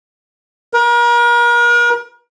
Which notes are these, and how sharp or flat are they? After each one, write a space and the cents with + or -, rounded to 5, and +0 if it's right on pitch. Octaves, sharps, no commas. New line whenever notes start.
A#4 +40